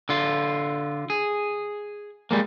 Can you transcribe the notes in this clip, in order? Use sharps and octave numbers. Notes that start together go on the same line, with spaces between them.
D3 F4
G#4
G3 G#3 A#3